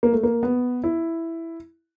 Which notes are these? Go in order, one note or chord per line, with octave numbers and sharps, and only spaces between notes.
A#3
A3
A#3
B3
E4